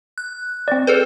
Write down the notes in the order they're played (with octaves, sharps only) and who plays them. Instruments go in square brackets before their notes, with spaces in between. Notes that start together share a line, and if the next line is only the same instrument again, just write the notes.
[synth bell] F#6
[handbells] C4 D5
[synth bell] G#4 A4 B4